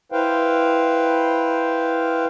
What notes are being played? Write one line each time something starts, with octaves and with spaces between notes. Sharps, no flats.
E4 B4 C5 F5 G5